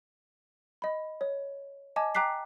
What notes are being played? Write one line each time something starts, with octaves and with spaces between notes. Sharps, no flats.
D#5 B5
C#5
D#5 G#5 A5 D6 G#6
G5 A#5 D6 F#6 B6 C7